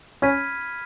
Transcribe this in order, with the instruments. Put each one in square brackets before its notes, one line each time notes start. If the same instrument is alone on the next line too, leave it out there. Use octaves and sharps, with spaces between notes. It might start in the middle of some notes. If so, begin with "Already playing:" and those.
[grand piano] C#4 [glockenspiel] B5 F6 G#6 B6 D#7